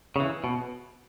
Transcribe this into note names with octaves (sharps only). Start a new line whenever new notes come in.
C#3 E3
B2